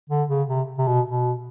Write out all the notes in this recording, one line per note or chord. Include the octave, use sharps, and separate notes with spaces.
D3
C#3
C3
C3
B2
B2